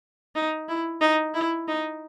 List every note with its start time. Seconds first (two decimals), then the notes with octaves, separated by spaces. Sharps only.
0.35 D#4
0.68 E4
1.01 D#4
1.35 E4
1.68 D#4